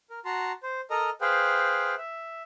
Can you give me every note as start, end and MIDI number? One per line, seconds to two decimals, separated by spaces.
0.10 0.19 70
0.25 0.52 66
0.25 0.52 81
0.25 0.52 82
0.25 0.52 84
0.63 0.81 72
0.91 1.10 69
0.91 1.10 70
0.91 1.10 75
0.91 1.10 82
1.21 1.95 68
1.21 1.95 71
1.21 1.95 72
1.21 1.95 77
1.21 1.95 79
1.98 2.42 76